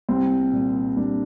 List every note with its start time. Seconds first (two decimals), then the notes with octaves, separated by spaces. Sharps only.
0.09 C2 C4
0.53 A#2 G3
0.97 C2 D4